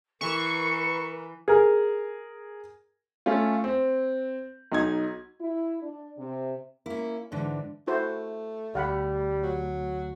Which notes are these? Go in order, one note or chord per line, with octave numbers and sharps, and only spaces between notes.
E3 A#4 B4 C#6
G#4 A#4
A3 C#4 F4
C4
B1 D#4 G#6
E4
D4
C3
A#3 C#4 E4
G#2 D3 E3 D4
A3 E4 F#4 C5
D2 G3 F5 F#5 B5
F#3